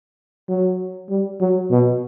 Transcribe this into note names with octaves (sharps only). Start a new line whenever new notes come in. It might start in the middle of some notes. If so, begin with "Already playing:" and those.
F#3
G3
F#3
B2